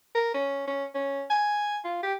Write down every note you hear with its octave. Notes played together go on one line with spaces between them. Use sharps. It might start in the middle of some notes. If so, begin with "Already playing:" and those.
A#4
C#4
C#4
C#4
G#5
F4
G4